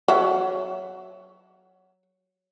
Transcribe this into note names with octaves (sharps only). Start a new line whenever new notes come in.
F#3 E5